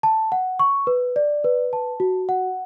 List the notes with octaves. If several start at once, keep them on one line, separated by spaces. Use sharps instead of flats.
A5
F#5
C#6
B4
D5
B4
A5
F#4
F#5